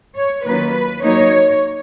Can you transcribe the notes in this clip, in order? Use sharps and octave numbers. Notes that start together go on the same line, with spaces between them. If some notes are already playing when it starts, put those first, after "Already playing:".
C#5
D#3 F#3 A#3 C#4 F4 B4
F#3 A#3 D#4 C#5